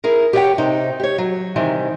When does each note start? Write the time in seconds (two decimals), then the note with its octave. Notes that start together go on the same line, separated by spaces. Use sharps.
0.04 E4 G#4 A#4
0.33 G4 B4 C#5 D5 F#5 G5
0.58 C3 D#4
1.00 G4 C#5
1.18 F#3
1.56 C3 D#3 E3 G3